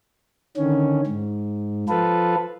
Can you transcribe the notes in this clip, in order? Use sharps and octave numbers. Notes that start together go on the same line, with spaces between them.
D3 D#3 C#4
G#2
F3 F4 A4 B4